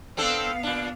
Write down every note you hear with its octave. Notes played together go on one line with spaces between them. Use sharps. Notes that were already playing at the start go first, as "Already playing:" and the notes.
B3 C4 D4 A4 F5
A#2 D4